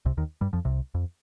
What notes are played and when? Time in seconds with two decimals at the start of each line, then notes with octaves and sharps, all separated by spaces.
0.05 C2 C3
0.17 D#2 D#3
0.41 G2 G3
0.53 F2 F3
0.65 C2 C3
0.94 F2